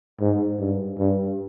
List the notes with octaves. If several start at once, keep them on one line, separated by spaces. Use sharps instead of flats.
G#2
G2
G2